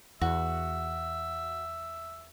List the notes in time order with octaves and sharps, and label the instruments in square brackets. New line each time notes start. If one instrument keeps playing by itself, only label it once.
[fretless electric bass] E2 [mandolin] F#4 [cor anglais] E5